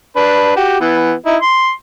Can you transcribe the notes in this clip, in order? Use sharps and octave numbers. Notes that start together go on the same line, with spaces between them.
D4 B4
F#4 G4
E3 B3
D#4 E4
C6